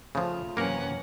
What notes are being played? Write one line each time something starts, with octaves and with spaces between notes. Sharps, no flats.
C#3 F3 A3 F4
F#2 C3 E3 A#3 C#4 A#4 F#5